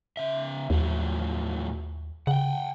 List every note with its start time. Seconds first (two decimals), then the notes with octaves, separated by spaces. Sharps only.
0.17 C#3 E5
0.70 D#2 A2 F3 F#3
2.27 C#3 F#5 G5